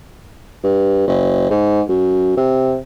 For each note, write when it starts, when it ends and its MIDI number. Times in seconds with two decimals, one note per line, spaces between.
0.64 1.05 43
1.07 1.47 30
1.50 1.81 44
1.89 2.34 42
2.37 2.77 48